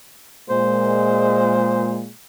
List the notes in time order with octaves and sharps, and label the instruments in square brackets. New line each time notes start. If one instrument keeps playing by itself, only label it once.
[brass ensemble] A#2 G#3 [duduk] C5